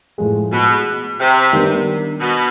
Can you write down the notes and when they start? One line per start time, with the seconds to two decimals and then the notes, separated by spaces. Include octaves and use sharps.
0.18 A2 F3 G#3
0.52 B2
1.19 C3
1.53 D#3 G3 B3 D4
2.20 B2